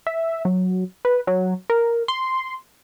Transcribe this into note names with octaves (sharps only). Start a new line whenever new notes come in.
E5
F#3
B4
F#3
A#4
C6